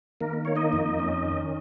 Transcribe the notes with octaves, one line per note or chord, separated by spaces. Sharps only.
D#3 A#3 A#4
A#3 C#5
D#4 D#5
F2
C#4
D#3